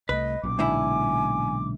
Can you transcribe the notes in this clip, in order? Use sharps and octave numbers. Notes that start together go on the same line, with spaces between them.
C2 A3 B4 D#5
B1 A#2 C#4 D6
G#2 D3 E4 G#5